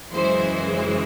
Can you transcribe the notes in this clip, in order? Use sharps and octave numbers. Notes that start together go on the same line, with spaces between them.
F#2 C#3 E3 G#3 C5
C5